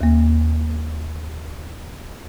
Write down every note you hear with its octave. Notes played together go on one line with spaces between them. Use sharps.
D#2 A#3